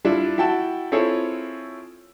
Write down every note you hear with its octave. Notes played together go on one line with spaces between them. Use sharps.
G3 D4 E4 F4
E4 F#4 G5 A5
C4 E4 F4 G#4 A4 C#5